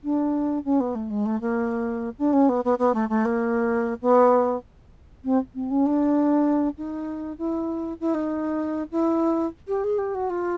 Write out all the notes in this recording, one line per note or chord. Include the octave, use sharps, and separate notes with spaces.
D4
C#4
B3
A3
G#3
A3
A#3
D4
C#4
B3
B3
B3
A3
A3
A#3
B3
C4
C4
C#4
D4
D#4
E4
E4
D#4
E4
G4
G#4
G4
F#4
F4